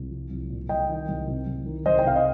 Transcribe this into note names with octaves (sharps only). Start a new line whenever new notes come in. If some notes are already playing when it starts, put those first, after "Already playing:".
Already playing: C2
F3
C2
A#2
C2 D#5 G5
D#3
C2
C3
C2
D#3
C2 C5 D#5
G5
C3 F5
D#5